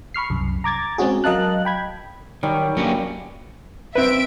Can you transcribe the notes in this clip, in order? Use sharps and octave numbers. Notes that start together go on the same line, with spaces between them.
B5 C#6 F6 C7
C2 F#2
A#5 D6 G#6 A6
G#3 C4 C#4 F#4 G#4
F#3 A#4 D#5 F5 A5 F#6
G5 B5 G#6
D#3 F#3 G3
G2 F#3 A#3 C#4
C4 B4 E5 D7